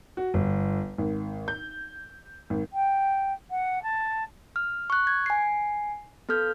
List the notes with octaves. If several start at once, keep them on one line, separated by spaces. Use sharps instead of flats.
F#4
G1
G#1
G6
G#1
G5
F#5
A5
F6
C#6 F#6
G#6
G#5 C7
B3 A4 F6 G6